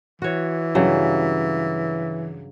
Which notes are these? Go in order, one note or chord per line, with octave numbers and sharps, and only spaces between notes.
E3 F#4 C#5
G2 C#3 F#3